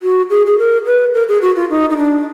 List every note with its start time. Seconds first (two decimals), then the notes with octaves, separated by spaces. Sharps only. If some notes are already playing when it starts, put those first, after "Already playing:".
0.03 F#4
0.30 G#4
0.46 G#4
0.58 A#4
0.86 B4
1.14 A#4
1.28 G#4
1.42 F#4
1.56 F4
1.70 D#4
1.90 D#4
1.97 D4